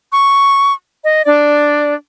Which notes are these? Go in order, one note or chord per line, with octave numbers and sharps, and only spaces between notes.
C#6
D#5
D4 D5